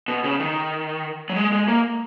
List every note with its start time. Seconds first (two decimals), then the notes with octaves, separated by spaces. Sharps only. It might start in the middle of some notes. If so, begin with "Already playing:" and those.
0.08 B2
0.24 C#3
0.40 D#3
1.29 F#3
1.36 G#3
1.53 G#3
1.68 A#3